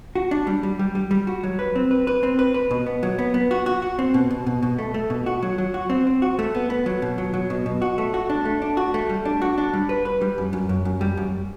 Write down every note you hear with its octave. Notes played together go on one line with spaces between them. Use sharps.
F#4
D4
G3
G3
G3
G3
G3
F#4
F#3
B4
C4
B4
B4
C4
B4
B4
B2
B3
F#3
B3
B3
F#4
F#4
F#4
C4
B2
B2
B2
B2
A3
A3
B2
F#4
F#3
F#3
F#4
C4
C4
F#4
A3
B3
B3
F#3
B2
F#3
F#3
B2
B2
F#4
A3
F#4
D4
A3
D4
F#4
A3
G3
D4
F#4
D4
G3
B4
B4
G3
F#2
F#2
F#2
F#2
G3
F#2